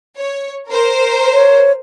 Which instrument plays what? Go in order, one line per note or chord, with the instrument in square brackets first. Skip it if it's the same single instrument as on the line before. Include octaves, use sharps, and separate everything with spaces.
[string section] C#5
A#4 C5
[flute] C#5